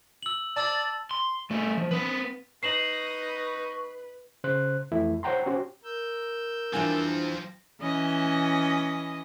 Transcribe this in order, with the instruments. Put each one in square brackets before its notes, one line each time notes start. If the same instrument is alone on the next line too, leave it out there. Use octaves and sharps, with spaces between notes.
[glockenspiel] E6 F#7
[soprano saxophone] D5 [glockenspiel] A5 E6 A6
[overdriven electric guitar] C6
G3 A3
F3
C4 B4
[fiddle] D#4 [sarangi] B4 [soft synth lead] C#6 [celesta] C7 E7 F#7
[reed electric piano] C#3 C5 F#6
F2 E3 A3 E4
C5 C#5 F#5 G5 A#5 C6
C#4 F#4 G4 C5
[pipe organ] A#4 E6 G6
[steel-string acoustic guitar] E3 F4 G#5 [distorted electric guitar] F3 C4 [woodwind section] G3 D4
[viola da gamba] E3 C#4 D#5